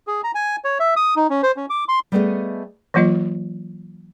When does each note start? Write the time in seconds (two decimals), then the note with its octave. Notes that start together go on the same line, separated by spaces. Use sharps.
0.07 G#4
0.24 A#5
0.35 G#5
0.64 C#5
0.80 E5
0.96 D#6
1.16 D#4
1.30 C#4
1.43 C5
1.57 C#4
1.70 D6
1.88 C6
2.12 G3 A3 B3 G#4 A4 D#5
2.94 E3 F#3 A#3 F4 D#5